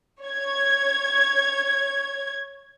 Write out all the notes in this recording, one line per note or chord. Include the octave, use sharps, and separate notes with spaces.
C#5 G#6